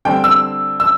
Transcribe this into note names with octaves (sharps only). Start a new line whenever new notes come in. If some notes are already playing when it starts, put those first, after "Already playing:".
D3 G3 C4 G5
E6
E6